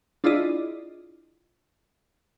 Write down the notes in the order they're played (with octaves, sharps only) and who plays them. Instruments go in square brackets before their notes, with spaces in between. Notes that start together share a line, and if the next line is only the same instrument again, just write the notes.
[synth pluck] D4 E4 F4 G#4 D5 D#5